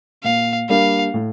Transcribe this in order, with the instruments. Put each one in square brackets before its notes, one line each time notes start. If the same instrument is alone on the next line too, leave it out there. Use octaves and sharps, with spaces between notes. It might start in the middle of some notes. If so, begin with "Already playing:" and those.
[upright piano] A#2 [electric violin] F5
[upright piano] G3 A#3 D4 [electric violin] F5
[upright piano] A2